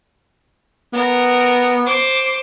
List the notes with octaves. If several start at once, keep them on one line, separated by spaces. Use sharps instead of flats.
B3 A#4
C5 D6